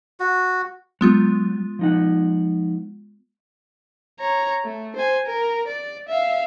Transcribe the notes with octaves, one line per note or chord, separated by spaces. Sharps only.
F#4
F#3 G#3 B3 F4
F3 D#4 F#5
C#5 A#5
A3
C5 G#5
A#4
D5
E5 F5